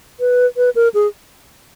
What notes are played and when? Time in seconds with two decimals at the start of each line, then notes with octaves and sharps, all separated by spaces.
0.20 B4
0.57 B4
0.76 A#4
0.94 G#4